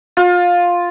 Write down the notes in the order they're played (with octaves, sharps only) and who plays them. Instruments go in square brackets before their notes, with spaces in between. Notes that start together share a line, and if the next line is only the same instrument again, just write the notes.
[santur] F4